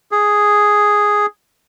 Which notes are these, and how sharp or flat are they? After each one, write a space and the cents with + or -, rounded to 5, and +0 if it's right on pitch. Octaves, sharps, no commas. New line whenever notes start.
G#4 +0